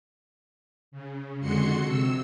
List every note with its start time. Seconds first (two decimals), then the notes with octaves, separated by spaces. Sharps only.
0.91 C#3
1.40 F2 D3 G#3 F#4 C6 C#7
1.84 C3 E6